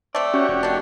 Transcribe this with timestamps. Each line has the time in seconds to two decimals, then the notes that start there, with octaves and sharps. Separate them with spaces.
0.15 A3 C4 D5
0.34 C#4 F#4 G4 C#5
0.49 F1
0.63 D#3 D4